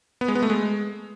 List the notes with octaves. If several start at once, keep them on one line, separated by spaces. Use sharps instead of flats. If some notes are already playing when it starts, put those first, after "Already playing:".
B3
G#3
B3
A3
G#3